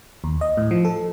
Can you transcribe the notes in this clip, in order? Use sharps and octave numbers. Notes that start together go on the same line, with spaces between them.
D#2
D#5
A2
F3
A4